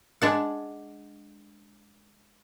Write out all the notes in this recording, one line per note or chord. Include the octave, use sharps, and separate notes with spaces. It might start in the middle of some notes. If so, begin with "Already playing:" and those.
G#3 D4 F#5